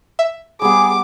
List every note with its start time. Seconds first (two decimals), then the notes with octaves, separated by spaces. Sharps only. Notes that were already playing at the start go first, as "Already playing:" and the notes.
0.19 E5
0.62 G3 B3 G#4 D6